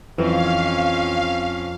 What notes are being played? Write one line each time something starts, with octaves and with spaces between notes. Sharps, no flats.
F2 E3 F3 C4 C#4 F5